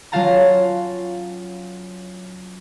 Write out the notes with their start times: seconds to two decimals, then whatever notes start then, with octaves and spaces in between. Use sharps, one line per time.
0.12 F#3 C#4 F4 F5 A5 A#5